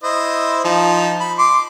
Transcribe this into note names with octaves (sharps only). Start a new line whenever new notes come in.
E4 C5 D#5
F3 D#4
B5
C6 D6